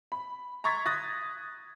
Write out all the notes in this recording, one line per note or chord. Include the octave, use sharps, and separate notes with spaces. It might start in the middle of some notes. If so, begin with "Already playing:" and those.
B5
A#5 C6 C#6 G#6 A6 B6
D#6 F#6 A6 A#6